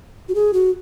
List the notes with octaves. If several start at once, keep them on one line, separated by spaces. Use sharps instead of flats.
F#4
G#4
F#4